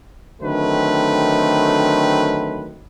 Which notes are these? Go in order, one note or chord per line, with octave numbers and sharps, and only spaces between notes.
D3 D#3 F#3 A3 C4 B4